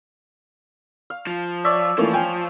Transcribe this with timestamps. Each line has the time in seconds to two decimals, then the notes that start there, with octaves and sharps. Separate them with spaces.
1.10 F5
1.27 F3
1.64 C#5 D5 E5
1.98 E3 F3 A3 A#3 C#5
2.13 F4 G5 G#5